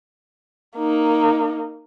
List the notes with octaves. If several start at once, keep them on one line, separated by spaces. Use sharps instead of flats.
A#3 D#4